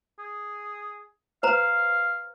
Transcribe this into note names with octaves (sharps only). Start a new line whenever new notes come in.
G#4
B4 C5 F5 A#5